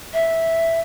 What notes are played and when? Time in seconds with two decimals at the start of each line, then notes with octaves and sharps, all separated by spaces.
0.14 E5